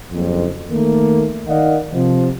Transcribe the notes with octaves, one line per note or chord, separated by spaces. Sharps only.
F#1 F2
D#3 A3 A#3
D#3 A#4 D5 D#5 F5 F#5
C3 F3